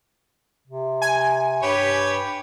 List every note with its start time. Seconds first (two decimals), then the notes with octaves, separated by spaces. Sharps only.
0.67 C3
1.02 G#5
1.62 G2 G4 B4 C#5